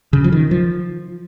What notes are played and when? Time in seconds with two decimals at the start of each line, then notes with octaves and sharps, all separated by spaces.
0.13 C#3
0.24 F3
0.32 D#3
0.51 F3